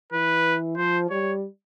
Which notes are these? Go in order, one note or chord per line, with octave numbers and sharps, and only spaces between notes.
E3 B4
F3 C5
G3 C#5